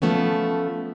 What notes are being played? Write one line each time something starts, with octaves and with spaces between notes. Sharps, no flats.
F3 A3 B3 C#4